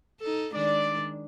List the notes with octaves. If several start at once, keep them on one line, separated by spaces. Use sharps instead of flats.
D#4 A4
D#3 G#3 D4 D5